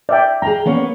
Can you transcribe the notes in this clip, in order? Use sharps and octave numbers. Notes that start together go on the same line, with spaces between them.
D5 E5 G5
G#4 G5 A#5
A#3 B3 C#4